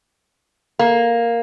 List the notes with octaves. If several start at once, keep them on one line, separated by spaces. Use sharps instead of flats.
A#3